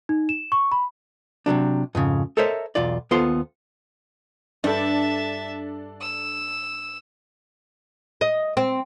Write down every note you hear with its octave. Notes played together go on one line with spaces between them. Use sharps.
D#4
E7
C#6
B5
C3 E3 F#3 D4
F2 G#2 C#3
A4 A#4 C5 C#5 D#5 E5
B1 E2 F4 D5
D#2 B3 F4 A4 C5 C6
G2 D4 A4 E5 G5 A5
E6
D#5
C4